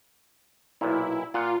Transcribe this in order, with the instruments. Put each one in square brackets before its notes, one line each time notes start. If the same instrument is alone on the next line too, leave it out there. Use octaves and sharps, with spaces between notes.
[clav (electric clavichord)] B1 A#2 [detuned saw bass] E4
[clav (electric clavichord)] A#2 F#5 [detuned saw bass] F4